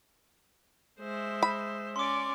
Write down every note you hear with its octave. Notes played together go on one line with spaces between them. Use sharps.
G#3 C5 E5
B5
C#4 D5 C6 D6